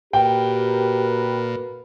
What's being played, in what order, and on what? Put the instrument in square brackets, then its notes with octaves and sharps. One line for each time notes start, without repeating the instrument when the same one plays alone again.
[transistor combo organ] A#2 [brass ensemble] F#4 A#4 B4 [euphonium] G4 [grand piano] G5